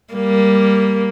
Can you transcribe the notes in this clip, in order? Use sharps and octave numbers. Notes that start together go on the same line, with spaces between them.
G3 A#3